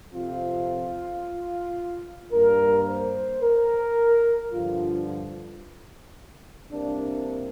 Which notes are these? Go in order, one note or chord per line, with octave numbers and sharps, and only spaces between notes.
F2 C3 F3 C4 F4
G2 G3 A#3 A#4
C5
A#4
G2 D3 F3 F4
C2 C3 A#3 D4